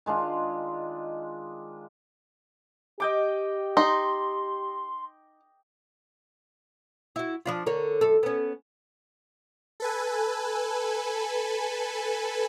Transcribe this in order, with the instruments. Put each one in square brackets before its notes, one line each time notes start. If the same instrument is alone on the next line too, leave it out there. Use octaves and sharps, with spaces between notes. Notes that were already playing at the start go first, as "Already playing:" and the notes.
[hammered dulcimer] D#3 G#3 D4 F4
[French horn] G4 [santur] D#5 G5 D6
[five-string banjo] D#4 [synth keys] C6
[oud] E4 F#4
F3 D4 F4
D3 A#4 C#5
F#2 A4
B3 C#4
[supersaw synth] A4 B4 G#5